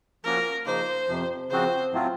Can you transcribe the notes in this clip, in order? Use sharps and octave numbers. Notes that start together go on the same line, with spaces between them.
F3 A#3 C#4 F#4 A#4
C#3 F3 A#3 D#4 C5
F2 C3 F3
C#3 F3 C4 F#4 C5
A2 F#3 A3 C4 F4